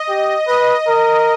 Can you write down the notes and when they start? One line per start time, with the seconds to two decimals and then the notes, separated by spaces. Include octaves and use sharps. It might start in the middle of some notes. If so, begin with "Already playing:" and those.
Already playing: D#5
0.09 G4
0.48 B4 D#5
0.87 A#4